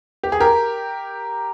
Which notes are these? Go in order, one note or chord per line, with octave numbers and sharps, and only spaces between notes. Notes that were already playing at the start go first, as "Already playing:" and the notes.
G4
G#4
G4 A#4